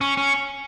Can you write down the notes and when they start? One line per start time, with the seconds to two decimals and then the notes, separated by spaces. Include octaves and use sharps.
0.01 C#4
0.17 C#4